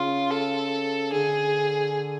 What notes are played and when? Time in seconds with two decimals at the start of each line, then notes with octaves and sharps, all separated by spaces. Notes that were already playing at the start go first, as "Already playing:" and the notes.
Already playing: C#3 F4
0.30 A4
1.12 D3 G#4